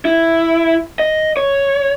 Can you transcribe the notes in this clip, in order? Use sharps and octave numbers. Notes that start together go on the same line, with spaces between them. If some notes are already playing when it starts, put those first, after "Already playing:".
E4
D#5
C#5